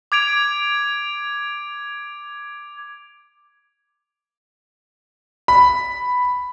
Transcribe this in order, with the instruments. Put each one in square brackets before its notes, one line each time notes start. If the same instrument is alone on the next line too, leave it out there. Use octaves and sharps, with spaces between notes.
[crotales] D6 G#6 D7 F7
[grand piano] B5